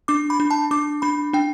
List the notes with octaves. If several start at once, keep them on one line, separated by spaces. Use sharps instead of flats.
D4 D6
B5
D4
A5
D4 D6
D4 B5
D4 G5